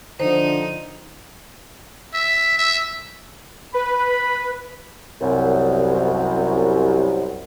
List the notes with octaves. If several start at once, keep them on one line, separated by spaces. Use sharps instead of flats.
D3 F3 D#4 C5
E5
E5
B4 B5
C2 F#2